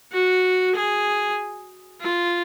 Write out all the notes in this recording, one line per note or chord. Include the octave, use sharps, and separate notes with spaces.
F#4
G#4
F4